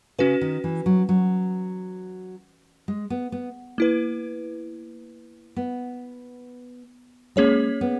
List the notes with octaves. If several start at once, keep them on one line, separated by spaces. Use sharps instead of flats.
C#3 C#4 F#4 B4
D#3
E3
F#3
F#3
G#3
B3
B3
A#3 E4 B4
B3
G#3 A#3 C#4 G#4 C#5
B3